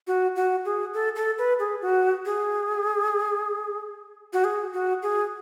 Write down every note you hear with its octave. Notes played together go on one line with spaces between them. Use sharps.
F#4
F#4
G#4
A4
A4
B4
G#4
F#4
G#4
F#4
G#4
F#4
G#4